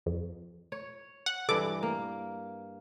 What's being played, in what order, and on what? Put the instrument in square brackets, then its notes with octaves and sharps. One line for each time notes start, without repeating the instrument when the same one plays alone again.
[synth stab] F2
[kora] C#5
[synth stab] F#5
[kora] G2 E3 [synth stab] A4 D6
[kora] A#3